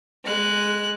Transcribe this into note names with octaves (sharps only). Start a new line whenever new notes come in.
G#3 F#6